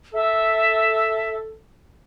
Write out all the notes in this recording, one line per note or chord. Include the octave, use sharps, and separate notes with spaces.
A4 E5